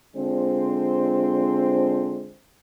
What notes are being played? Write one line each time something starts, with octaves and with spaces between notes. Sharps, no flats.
D3 G#3 C4 D4 F4 C5